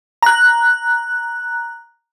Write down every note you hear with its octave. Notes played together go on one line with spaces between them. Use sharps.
A#5 F#6